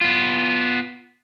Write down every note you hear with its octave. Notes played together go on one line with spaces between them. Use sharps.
B3 F4